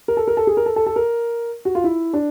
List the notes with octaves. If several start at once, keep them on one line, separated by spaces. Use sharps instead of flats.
A#4
A4
A#4
A4
G#4
A#4
A4
A4
A4
A#4
F#4
F4
E4
D4